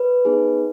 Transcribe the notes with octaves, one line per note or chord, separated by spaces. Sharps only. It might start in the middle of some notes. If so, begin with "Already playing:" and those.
Already playing: B4
B3 D#4 G#4